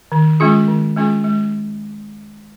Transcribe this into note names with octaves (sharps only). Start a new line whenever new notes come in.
D#3
G#3 C#4 F4 G#4
D#3
G#3 C#4 F4 G#4
G#3